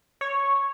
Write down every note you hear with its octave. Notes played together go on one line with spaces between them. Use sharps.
C#5